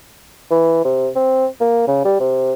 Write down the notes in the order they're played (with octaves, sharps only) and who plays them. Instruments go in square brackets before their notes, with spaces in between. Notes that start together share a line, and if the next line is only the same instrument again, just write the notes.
[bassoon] E3
C3
C4
A#3
C#3
G3
C3